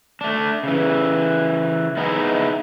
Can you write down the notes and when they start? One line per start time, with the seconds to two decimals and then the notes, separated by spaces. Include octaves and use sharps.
0.21 A3 D4
0.63 C#3 E3
1.97 B3 D#4 E4 G#4